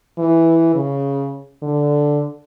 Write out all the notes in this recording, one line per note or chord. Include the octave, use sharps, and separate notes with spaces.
E3
C#3
D3